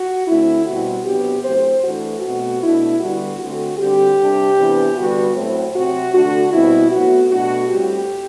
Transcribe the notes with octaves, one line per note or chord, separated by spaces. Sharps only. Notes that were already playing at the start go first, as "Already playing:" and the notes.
Already playing: F#4
D3 A3 C4 E4
B2 G3 C4 F#4
C3 F#3 B3 D4 G4
A2 F#3 A3 C4 C5
E3 A3 D4 F#4
B2 A3 C4 F#4
B2 A3 D4 E4
D3 G3 B3 F#4
D3 A3 C4 F#4
D3 G3 C4 G4
C3 G3 D4
C3 E3 B3 D4
D3 G3 B3 F#4
A2 F#3 A3 C4
C3 F#3 C4 F#4
D3 A3 D4 F#4
B2 G3 C4 E4
A2 F#3 B3 F#4
B2 A3 D4 F#4
A2 G3 C4 G4